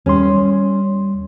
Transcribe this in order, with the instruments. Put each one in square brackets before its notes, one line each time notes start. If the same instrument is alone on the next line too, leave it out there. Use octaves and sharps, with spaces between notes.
[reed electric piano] D#2 G3 C6 [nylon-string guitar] C#4